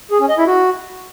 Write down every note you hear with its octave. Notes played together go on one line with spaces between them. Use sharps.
G#4
C#4
D#5
E4
F#4